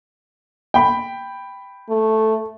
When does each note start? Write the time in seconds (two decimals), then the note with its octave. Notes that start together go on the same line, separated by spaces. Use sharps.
0.74 G5 B5
1.90 A3